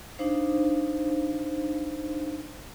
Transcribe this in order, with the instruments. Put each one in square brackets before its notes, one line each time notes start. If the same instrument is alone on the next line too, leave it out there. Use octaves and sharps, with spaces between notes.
[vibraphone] D4 D#4 C5 F5